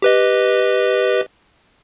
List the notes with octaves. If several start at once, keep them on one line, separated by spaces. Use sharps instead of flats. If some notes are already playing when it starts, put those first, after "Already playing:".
G4 B4 D#5